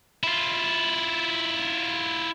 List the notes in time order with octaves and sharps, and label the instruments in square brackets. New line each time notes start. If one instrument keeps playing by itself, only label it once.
[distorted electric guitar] E4 F4